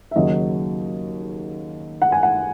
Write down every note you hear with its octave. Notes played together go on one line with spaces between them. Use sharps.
E5
D#2 C#3 F#3 D#5
F#5
G#5
F#5